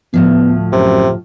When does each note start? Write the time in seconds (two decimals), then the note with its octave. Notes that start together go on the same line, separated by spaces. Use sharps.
0.14 D2 A2 F3 B3
0.72 F#2 C3